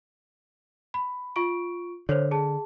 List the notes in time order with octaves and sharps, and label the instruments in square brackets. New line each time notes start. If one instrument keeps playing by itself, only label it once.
[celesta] B5
F4 C#6 D7
[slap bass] D3 [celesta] C5 C#5
[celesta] G#4 A5